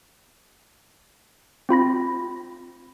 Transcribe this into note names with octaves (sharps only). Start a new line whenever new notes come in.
C4 F4 B5 A#6